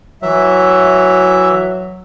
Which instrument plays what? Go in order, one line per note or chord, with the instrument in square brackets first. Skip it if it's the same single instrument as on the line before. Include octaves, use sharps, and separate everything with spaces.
[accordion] E3 E5 [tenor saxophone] F#3